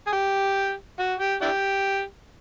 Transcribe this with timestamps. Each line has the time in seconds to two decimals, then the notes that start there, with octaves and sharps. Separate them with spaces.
0.07 G#4
0.12 G4
0.99 F#4
1.19 G4
1.41 D4 E4 G4